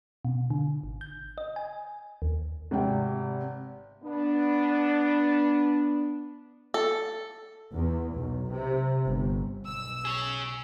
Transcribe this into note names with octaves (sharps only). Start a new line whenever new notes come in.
B2
D3
G#1
G6
D#5
G#5
D#2
G#1 C3 G5
B3 D4
A4
E2
B1
C3
G1
B1 E6
G#4 C#5